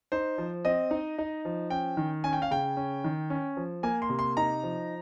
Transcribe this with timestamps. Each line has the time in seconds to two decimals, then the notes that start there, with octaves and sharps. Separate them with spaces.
0.12 D#4 C5
0.38 F3
0.65 C4 D#5
0.91 D#4
1.18 D#4
1.45 F3
1.70 C#4 G5
1.97 D#3
2.24 C#4 G#5
2.33 G5
2.42 F5
2.51 C#3 G5
2.77 C#4
3.04 D#3
3.30 C#4
3.57 F3
3.83 A#3 G#5
4.02 C6
4.09 C3
4.19 C6
4.37 D#4 A#5
4.63 F3